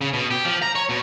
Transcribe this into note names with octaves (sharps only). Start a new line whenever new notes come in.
C#3
B2
G4
F3
A#5
C#5
B2